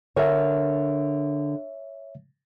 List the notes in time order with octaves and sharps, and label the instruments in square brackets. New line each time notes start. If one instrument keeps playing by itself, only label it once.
[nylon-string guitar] D3 A#4 G#5 [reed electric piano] C#5 E5